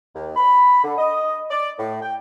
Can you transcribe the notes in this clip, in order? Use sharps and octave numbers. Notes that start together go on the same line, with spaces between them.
D#2
B5
D3
D#5
D5
A2
G5